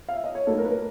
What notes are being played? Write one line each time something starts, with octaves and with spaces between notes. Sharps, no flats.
F5
E5
D#5
C#5
A2 F#3 A#3 D#4 A4
A#4
B4
A#4